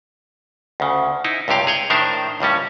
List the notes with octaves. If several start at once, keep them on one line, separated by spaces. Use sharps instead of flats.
D2 C#3
D#4 E4
C#2 G2 C3 G4 F5
G#4 C#5 G5
A2 D#3 D4 A#4 C5 E5
C#2 A2 G3 C#4